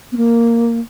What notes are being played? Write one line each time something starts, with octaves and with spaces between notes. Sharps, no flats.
B3
A#3